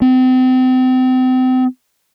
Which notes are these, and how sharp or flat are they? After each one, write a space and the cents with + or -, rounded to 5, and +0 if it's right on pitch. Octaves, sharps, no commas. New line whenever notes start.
C4 -35